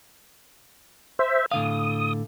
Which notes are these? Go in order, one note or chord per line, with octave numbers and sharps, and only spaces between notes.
C5 E5
A2 D3 F5 D#6